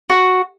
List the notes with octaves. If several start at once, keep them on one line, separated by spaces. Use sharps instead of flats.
F#4